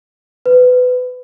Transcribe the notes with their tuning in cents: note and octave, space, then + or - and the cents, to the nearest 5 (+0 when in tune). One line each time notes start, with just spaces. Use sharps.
B4 +20